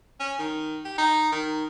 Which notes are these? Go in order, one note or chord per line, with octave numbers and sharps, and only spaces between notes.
C#4
D#3
G4
D#4
D#3